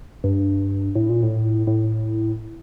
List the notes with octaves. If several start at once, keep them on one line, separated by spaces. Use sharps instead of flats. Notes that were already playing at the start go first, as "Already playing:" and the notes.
G2
A2
A#2
A2
A2